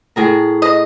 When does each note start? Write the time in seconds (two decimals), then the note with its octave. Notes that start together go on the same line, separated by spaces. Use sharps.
0.16 A2 G#4 A#4
0.62 D#5